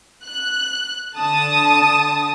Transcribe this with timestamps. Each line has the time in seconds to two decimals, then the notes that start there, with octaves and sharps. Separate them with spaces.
0.24 F#6
1.17 D3 A5 D#6